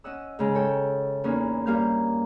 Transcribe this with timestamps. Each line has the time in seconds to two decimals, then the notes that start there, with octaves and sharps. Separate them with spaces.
0.04 C#4 D#5 F#5 E6
0.39 G#2 C#3 G#3
0.55 A4 C#5 G5
1.24 E2 A#3 C#4 D#4
1.66 G2 A#3 F5 G6